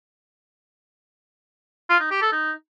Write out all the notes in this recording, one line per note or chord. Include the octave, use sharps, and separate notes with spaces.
F4
D#4
G4
A4
D#4